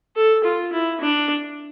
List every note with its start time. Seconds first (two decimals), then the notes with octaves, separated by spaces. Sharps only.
0.16 A4
0.44 F4
0.73 E4
1.00 D4